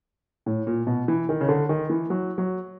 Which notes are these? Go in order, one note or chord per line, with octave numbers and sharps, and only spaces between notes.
A2
A#2
B2
E3
D#3
C#3
D3
D#3
E3
F#3
F#3